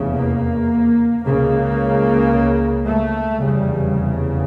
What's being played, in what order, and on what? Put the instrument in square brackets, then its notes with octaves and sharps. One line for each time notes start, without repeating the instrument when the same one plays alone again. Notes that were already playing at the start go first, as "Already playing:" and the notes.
Already playing: [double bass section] F1 E2 C#3
A#3
C#2 C#3 A#3
A3
F1 E2 C#3 G3